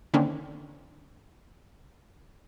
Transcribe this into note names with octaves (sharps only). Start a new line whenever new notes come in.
D3 D#3 A#3 C4 C#4